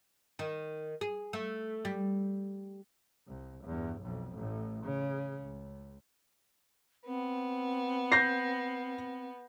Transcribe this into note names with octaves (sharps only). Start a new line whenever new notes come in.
D#3
G#4
A3
G3
C2
E2 G2
B1 F2
A1 A2
C#3
C#2
B3 C4
G6 A#6 C7